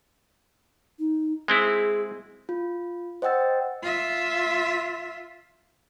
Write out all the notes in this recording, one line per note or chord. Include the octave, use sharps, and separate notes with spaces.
D#4
G#3 C4 E4 G#4
F4
C5 D#5 F#5 G5 E6 A6
F4 E5